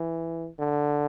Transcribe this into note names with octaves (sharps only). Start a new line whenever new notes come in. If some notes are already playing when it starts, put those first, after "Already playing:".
Already playing: E3
D3